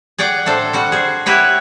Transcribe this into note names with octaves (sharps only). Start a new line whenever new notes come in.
G#4 D5 F#5 G5
A2 D4 A4 C5
G3 F#4 F#5
G#4 C5
E4 F#4 G4 B4 C#5